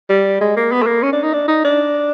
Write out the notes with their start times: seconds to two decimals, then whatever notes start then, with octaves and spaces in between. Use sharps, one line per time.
0.09 G3
0.41 G#3
0.57 A#3
0.72 B3
0.82 A3
0.86 A#3
1.03 C#4
1.13 D4
1.23 D#4
1.33 D4
1.48 D#4
1.64 D4